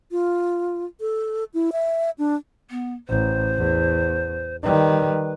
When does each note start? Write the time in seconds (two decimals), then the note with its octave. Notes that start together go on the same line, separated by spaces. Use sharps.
0.11 F4
1.00 A4
1.54 E4
1.72 E5
2.18 D4
2.71 B3
3.08 A1 C5
3.57 E2
4.63 D#3 G3 B4